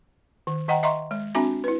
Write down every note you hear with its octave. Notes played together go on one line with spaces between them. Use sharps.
D#3
D#3 D#5 F#5 G5 A#5
D#5 E5 A#5 C6 C#6
G#3
C4 D4 F#4 E5 G#5 A#5
E4 B4